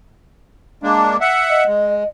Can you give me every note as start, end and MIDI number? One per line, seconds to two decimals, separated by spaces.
0.83 1.17 56
0.83 1.17 58
0.83 1.17 62
1.21 1.64 76
1.21 1.64 78
1.50 2.08 75
1.68 2.03 56